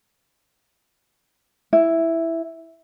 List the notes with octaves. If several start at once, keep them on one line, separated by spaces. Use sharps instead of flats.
E4